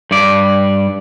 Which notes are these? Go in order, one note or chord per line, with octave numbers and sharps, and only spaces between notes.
G2 D5